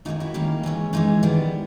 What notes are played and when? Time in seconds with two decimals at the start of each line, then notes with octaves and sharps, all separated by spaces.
0.05 D#3 G3 A#3 C#4 D#4 F4
0.20 E4 F#4
0.34 D#3 G3 A#3 C#4
0.63 E3 G#3 C#4
0.93 E3 G#3 C#4 D#4
1.23 D#3 G3 B3